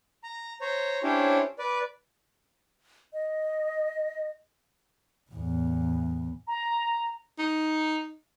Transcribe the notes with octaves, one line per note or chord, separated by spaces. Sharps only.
A#5
C5 C#5 A#5
C#4 D4 E4 G4 C5 C#5
B4 D5
D#5
E2 A2
A#5
D#4